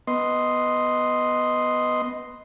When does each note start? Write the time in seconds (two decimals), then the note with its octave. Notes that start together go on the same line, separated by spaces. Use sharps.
0.07 B3 D#5 C6